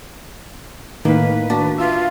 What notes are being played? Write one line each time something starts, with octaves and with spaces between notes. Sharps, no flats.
A2 D#3 A#3 B4
D4 F#4
F4 E5